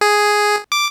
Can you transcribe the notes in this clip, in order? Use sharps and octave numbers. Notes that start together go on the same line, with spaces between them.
G#4
D6